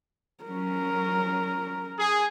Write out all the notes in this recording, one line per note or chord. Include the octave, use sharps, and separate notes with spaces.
F#3 C#4 A#4
G#4